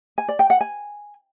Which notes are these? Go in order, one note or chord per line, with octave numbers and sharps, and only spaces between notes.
G#5
D5
G5
F#5
G#5